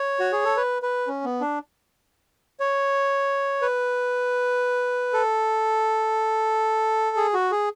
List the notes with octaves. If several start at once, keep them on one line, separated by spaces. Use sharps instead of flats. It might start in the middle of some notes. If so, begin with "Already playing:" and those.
Already playing: C#5
F#4
G#4
A4
B4
B4
C#4
B3
D4
C#5
B4
A4
G#4
F#4
G#4